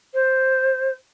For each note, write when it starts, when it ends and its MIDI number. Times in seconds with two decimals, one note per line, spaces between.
0.13 0.92 72